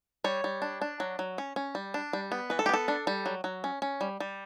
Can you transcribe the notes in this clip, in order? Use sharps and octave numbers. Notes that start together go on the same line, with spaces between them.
G3 C#5
G3
D4
D4
F#3
F#3
C#4
C#4
G3
D4
G3
B3
E3 B4
A4
G4
B3 A4
D4
G3
F#3
F#3
C#4
C#4
G3
G3